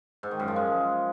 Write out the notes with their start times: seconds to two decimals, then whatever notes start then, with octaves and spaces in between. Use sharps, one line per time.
0.23 G#2
0.31 D#3
0.40 F#2
0.48 F3
0.56 G#3